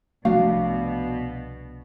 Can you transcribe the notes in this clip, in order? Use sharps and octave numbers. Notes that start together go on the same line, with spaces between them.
C2 B2 F3 A3 D4 F#4 F5